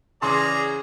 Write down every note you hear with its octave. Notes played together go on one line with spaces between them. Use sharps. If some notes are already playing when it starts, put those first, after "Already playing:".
C#3 E3 C#4 G#4 D5 A#5 C6